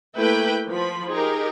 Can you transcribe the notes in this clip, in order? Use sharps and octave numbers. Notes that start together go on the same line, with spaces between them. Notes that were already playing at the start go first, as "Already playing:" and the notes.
A3 A#3 E4 B4 G5
F3 B5
D#4 G4 G#4 A#4